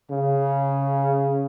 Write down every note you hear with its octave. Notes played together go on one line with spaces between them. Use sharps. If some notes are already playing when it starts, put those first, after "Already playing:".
C#3